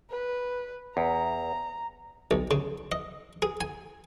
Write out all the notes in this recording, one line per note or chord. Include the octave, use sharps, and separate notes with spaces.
B4
E2 A#5
B1
C#3
D#5
G#4
G#5